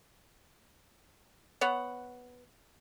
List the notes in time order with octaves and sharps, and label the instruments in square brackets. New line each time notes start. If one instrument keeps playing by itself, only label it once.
[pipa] B3 C#5 F#5